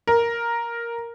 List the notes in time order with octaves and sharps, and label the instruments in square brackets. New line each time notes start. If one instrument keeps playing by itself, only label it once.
[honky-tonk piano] A#4